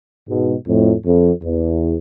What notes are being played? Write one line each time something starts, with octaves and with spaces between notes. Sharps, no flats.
G#2 B2
F2 A2
F2
E2